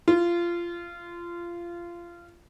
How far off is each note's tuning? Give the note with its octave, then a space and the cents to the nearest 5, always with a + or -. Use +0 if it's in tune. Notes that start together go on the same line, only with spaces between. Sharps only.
F4 -20